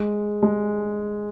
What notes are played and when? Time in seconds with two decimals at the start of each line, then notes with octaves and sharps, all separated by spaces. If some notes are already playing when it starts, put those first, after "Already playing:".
Already playing: G#3
0.43 G#3